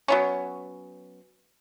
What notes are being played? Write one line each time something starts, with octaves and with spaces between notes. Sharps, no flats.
F#3 B3 C#4